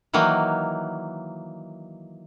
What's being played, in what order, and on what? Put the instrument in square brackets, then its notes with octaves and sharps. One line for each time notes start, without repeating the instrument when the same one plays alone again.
[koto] D#3 E3 F#3 A#3